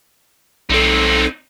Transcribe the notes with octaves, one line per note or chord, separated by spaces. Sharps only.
B1 C4 D#4 A4